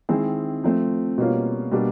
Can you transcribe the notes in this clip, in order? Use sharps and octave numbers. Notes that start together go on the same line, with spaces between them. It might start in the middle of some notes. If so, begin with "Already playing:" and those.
D#3 G#3 C4 E4 G#4
F3 A3 C4
B2 G3 A#3 C#4 F4
B2 G3 A#3 D4